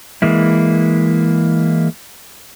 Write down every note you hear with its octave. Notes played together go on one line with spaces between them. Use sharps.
E3 G#3 A#3 E4